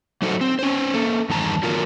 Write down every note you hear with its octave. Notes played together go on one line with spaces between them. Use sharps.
F#3 A3 D#4 F#4 A4 C5
C4
C#4 C5
A#3 A4
E2 G2 D#3 A5 A#5
F#3 F4 A#4